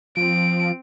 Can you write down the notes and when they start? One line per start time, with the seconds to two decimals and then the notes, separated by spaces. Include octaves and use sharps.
0.17 F3 C4 D7